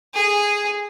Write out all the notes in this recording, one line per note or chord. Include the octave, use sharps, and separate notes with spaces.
G#4